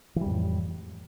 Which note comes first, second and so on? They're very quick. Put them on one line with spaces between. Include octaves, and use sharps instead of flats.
E3 G3 F2 A2